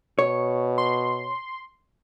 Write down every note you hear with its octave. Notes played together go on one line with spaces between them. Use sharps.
B2 C#5
C6